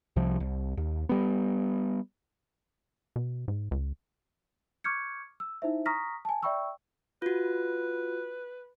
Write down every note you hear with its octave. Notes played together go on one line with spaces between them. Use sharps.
C2 C3 F3
C2
D#2
G3 B3
B2
G#2
C#2
C#6 D6 F6 G6 G#6 C#7
E6
D#4 E4 C5 E5
A#5 C#6 D#6 F6 A#6 B6
G#5 A5
D5 E5 G5 B5 C#6 E6
F4 F#4 B4